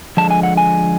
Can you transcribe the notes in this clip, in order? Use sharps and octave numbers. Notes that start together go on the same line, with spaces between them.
D3 F3 G#3 A5
G#5
F#5
G#5